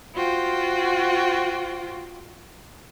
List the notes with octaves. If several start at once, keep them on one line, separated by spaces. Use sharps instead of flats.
F4 F#4 C5 G5